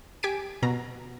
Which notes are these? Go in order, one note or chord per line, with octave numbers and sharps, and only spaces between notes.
G4 G#5 B6 D7
B2 A#5